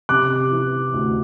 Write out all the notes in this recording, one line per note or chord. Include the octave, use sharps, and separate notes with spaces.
C3 D6 F#6
E3
D2